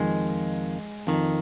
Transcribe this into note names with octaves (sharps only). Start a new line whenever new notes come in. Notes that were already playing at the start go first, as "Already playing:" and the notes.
Already playing: F2 D#3 G#3
F2 D#3